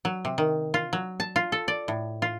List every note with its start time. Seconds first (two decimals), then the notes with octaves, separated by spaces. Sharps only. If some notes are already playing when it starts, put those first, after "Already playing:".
0.05 F#3
0.25 C3
0.38 D#3
0.74 F4
0.93 F#3
1.20 A5
1.36 F4
1.52 A4
1.68 D5
1.88 A2
2.22 F4